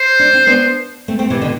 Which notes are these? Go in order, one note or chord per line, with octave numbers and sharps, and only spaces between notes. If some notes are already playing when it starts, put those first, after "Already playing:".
Already playing: C5
D4
C4
B3 D4
A3 C4
A3 C4
C3 E3
B2 D3